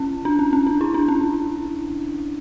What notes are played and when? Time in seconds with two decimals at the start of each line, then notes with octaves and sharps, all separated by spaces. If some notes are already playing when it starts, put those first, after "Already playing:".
Already playing: C#4
0.25 D4
0.39 C#4
0.53 C#4
0.67 D4
0.81 E4
0.94 D4
1.08 C#4